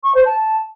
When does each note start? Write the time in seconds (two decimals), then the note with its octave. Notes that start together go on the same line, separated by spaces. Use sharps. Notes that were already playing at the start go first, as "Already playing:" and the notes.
0.04 C#6
0.15 C5
0.26 A5